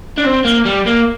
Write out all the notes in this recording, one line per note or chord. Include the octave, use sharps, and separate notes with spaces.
D4
C4
A#3
G3
A#3